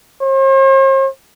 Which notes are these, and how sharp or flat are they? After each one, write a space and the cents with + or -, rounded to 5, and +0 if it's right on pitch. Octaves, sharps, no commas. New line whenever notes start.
C5 +45